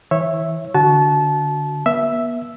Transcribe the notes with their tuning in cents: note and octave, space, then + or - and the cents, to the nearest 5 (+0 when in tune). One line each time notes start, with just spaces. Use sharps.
E3 -20 C#5 -15 E5 +0
D3 +0 F#4 +0 A5 -25
B3 -40 E5 +0